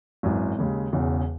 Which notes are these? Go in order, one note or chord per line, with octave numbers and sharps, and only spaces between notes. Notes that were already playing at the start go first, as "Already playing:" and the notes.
G#1 F#2 E3
D#2 C#3 G#3
E1 E2 C#3